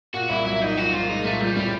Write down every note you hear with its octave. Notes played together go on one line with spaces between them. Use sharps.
A#2 F#4
C2 E4
F#3 E4
C2 D#4
F3 F#4
A#2 F4
G#3 D#4
A#2 A3
F3 G3
A2 G3